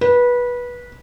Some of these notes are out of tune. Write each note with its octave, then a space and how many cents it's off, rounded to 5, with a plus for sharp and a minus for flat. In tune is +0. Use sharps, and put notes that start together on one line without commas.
B4 -20